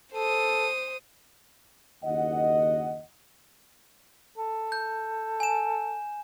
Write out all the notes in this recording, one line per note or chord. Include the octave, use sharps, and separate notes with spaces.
A4 C5 D#6
F#1 D#2 D#5 F#5
A4
G6
G#5 E7